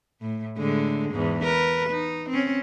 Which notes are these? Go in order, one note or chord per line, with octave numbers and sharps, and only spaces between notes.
A2
A2 D3 G#3
E2 G#2
A#4 B4
D#4
C4 C#4